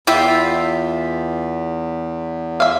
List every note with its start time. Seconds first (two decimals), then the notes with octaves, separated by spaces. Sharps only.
0.07 E2 E4 F4 E5 G5
2.60 E5 F5